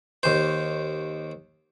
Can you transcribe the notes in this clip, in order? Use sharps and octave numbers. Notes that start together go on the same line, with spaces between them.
D#2 C5